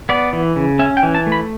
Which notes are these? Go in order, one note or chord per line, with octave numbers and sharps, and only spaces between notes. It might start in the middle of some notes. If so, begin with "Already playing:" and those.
B3 D5
E3
C#3
C#4 E5
G5
E3
A5
A3
B5